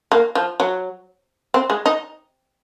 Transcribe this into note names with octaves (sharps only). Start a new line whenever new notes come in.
A#3
F3
F#3
C4
G#3
D#4